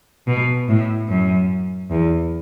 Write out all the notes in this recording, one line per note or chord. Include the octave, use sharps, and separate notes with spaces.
B2
A2
F#2
E2